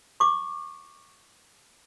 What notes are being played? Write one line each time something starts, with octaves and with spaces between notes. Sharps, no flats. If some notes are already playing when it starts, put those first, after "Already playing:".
C#6 D6